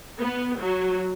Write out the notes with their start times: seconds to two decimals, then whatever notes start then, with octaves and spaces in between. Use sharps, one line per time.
0.19 B3
0.59 F#3